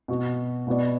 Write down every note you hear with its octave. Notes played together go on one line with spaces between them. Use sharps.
B2 B3 F#4
B2 B3 F#4 D5